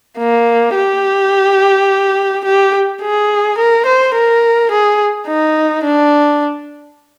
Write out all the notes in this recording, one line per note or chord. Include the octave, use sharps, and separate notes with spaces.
A#3
G4
G4
G#4
A#4
C5
A#4
G#4
D#4
D4